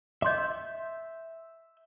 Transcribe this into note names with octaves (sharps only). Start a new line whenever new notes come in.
D#5 E5 C6 D6 G6